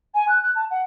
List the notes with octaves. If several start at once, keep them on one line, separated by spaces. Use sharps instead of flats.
G#5
F#6
F#6
A5
F#5